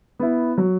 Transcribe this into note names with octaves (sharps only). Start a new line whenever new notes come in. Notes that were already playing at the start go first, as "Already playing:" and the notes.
B3 E4
F#3